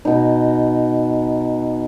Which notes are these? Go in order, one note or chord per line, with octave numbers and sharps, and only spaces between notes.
B2 D#4